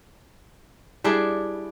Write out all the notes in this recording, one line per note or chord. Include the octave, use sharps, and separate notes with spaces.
G3 D4 E4 G#4